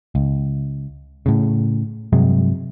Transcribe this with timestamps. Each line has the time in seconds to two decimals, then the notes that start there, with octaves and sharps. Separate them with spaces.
0.15 C#2
1.26 A2 C#3
2.13 G2 C3 F#3 G#3